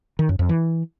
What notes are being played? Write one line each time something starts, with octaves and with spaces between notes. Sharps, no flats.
D#3
F#2
F2
E3